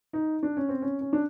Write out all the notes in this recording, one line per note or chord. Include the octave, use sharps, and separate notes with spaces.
D#4
D4
C#4
C4
C#4
C#4
D4